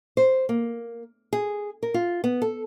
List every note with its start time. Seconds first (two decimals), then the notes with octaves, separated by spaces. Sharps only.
0.17 C5
0.49 A#3
1.33 G#4
1.83 A#4
1.94 F4
2.24 B3
2.42 A4